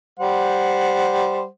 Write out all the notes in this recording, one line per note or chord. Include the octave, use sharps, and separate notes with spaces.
G3 C5 F#5